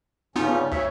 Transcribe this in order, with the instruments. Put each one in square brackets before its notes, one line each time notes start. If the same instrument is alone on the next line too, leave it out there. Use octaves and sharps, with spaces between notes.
[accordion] G2 C#3 C#4 [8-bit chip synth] B3 D#4 F4
[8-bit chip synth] D2 [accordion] C#5 E5